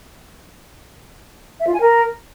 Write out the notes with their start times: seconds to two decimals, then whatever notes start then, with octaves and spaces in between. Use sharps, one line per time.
1.60 E5
1.67 F4
1.74 G#5
1.81 A#4